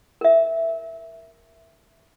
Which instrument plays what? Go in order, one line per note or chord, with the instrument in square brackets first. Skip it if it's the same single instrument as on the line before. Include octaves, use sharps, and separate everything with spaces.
[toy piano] A#4 E5